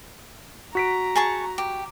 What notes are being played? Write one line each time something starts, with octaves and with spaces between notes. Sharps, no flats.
F#4 A#5 B6 D7
G#4 A5 C#6
G4